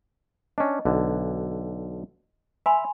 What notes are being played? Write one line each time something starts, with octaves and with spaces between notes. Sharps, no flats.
C#4 D4 D#5
B1 D3
E5 G#5 B5 C6